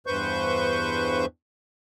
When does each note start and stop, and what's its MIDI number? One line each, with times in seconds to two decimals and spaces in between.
0.07 1.25 40
0.07 1.25 43
0.07 1.25 71
0.07 1.25 72
0.07 1.25 85
0.07 1.25 91